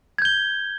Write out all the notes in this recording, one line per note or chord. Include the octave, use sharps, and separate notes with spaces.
G6 G#6 G7